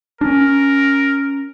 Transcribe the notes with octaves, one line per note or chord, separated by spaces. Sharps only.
C#4 D4 A#4